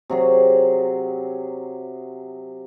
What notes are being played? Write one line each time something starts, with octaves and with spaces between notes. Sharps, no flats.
C3 F#3 G#4